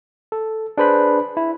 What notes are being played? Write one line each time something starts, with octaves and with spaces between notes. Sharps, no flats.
A4
D4 G#4 B4 C5 B5
E4